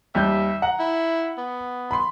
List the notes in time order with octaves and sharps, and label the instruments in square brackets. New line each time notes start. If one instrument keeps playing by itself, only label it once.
[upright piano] D#2 G3 G6 [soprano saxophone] E5
[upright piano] F#5 A#5
[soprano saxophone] E4
B3
[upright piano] B5 C6